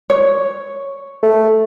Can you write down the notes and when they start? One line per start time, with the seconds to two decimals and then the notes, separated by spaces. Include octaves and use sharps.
0.10 C#5
1.23 A3